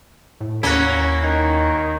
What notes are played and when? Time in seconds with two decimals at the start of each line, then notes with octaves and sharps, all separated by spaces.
0.41 A2
0.63 D#2 A#3 C#4 E4 F#4
1.23 D#3